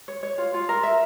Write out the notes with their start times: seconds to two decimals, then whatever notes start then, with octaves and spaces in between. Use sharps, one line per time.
0.08 C#5
0.23 C#5
0.38 F4
0.54 F4
0.69 A#4
0.83 E5